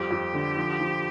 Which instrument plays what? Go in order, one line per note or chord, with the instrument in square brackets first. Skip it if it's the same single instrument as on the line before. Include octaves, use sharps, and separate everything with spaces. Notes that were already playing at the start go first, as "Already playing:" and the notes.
Already playing: [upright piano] F2 G3 [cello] G4
[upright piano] F2
D3
F3
F3